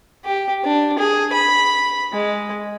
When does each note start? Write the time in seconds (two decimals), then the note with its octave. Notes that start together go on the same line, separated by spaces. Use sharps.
0.24 G4
0.64 D4
0.99 G#4
1.33 B5
2.13 G#3